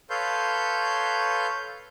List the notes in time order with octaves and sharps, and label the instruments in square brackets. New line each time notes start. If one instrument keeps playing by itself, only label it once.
[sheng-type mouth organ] A4 B4 C#5 F5 C6 G6